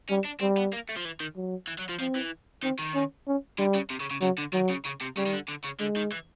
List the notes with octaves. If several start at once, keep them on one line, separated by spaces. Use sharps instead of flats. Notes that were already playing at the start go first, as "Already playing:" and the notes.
G3 C#4
D4
G3 C4
B3
A#3
A3
F3
E3
D#3
F#3
E3
F#3
F3
F3 C4
E3
D#3 C4
D#3
C#4
C#4
D3 G3
C#3
C3
C#3
C#3
C#3 F#3
D3
D#3 F#3
C#3
C#3
C3
C#3 G3
D#3
D3
D3
C#3
D3 G#3
D#3
E3